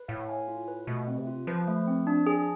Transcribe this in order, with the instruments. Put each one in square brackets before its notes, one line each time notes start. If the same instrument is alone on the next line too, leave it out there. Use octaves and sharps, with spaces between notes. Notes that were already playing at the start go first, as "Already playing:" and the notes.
Already playing: [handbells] B4
[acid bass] A2 [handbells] F5
[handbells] G#5
F4
B4
[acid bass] B2 [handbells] A3
[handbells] C4
[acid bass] C3
[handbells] F4
[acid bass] F3 [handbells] B4
[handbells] A3
C4
D4
G#4